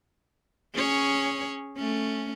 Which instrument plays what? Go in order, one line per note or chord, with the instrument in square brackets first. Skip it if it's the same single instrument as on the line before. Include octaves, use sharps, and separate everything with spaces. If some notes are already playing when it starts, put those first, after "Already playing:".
[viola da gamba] C#4 G#4 C#5
A3 C#4